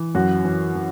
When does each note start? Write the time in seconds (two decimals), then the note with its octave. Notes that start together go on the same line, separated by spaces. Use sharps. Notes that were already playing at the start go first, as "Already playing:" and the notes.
Already playing: E3
0.15 F#2 F#4
0.45 E3
0.75 E3